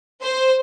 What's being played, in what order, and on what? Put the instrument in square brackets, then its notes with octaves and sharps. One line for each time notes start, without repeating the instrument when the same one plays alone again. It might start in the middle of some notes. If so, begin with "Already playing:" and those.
[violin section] C5